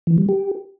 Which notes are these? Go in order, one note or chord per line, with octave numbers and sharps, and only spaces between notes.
E3
G3
G4